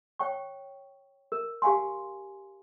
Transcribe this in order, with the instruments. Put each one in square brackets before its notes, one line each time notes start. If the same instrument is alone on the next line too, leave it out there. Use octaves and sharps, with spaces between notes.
[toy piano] C#5 G5 C#6
A#4
G4 F5 G#5 C6